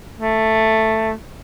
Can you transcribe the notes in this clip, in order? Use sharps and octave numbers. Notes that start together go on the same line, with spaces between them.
A3